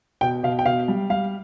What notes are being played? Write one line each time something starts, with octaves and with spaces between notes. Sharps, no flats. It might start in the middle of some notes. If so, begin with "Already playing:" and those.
B2 G5
B2 F5
G5
B2 F5
G3
G3 F5